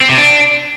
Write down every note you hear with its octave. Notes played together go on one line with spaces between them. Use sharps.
C4
C3
D4